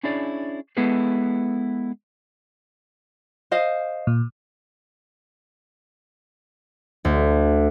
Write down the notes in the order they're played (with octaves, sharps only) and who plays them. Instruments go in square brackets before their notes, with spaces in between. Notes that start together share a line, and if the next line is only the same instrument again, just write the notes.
[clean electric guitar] C#4 D4 E4 G#4 C#5 D5
G#3 B3 E4 G#4 A4 B4
[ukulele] C5 D#5 F5
[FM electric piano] A#2
[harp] D2